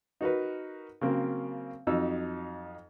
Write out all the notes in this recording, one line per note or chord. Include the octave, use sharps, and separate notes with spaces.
D#4 F#4 A#4 B4
C#3 F#3 A#3 C4
F2 F#3 D#4 E6